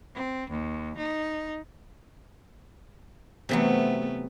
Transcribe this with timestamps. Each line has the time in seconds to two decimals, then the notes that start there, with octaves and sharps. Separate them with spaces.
0.15 C4
0.50 D#2
0.97 D#4
3.49 C3 E3 F#3 A3 B3